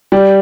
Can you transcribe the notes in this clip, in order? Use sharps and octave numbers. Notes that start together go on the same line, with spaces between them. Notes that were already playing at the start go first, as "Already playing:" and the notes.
G3